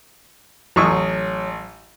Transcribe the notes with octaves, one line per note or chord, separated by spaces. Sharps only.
A1 F#3 C#6 D#6